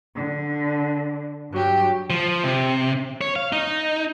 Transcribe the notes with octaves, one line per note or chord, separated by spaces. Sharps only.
D3
G2 F#3 G4
F3
C3
C#5
F5
D#4